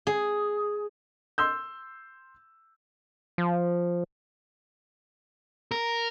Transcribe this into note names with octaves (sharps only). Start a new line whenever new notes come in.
G#4
C6 E6 G6
F3
A#4